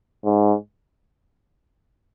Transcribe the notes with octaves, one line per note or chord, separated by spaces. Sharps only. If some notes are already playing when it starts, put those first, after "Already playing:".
G#2